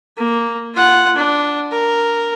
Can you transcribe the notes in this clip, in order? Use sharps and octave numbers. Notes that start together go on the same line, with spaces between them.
A#3
F4 F#5
D4
A#4